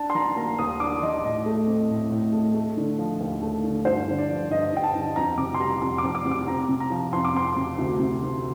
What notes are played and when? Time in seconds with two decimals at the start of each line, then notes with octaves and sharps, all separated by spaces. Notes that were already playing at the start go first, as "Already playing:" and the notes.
Already playing: D4 A5
0.10 C6
0.15 D#3 A#5
0.37 A#3 A#5
0.59 D#2 D#6
0.80 D4 D6
1.03 D#3 D#5
1.24 A2 D#5
1.46 A3
1.67 C4
1.90 A2
2.11 A2
2.33 A3
2.54 A3
2.77 D3
2.98 F3
3.20 D#2
3.42 A3
3.63 D3
3.85 G2 C5
4.07 D3
4.18 D5
4.29 F3
4.50 G2 D#5
4.73 G2 G5
4.83 A5
4.95 D3
5.16 F2 A#5
5.38 C3 D6
5.54 C6
5.60 G3 A#5
5.81 F2 C6
5.98 D6
6.04 F2
6.15 D6
6.25 C3
6.31 D6
6.48 C4 A#5
6.69 C3
6.80 A#5
6.90 F3
7.12 F2 C6
7.25 D6
7.35 C4 C6
7.56 C3
7.78 D2
7.99 C3
8.22 D#3